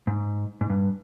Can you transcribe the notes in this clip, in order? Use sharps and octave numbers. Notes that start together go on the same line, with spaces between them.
G#2
G#2
G2